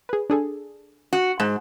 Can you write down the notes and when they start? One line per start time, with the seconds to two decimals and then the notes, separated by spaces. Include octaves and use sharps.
0.09 G#4 B4
0.30 D4 G#4 A4
1.13 F#4
1.40 G#2